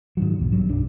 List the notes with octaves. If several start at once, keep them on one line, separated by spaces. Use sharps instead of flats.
G#2 D#3 F#3
B1 E2
G2 F#3
B1 F#2 D4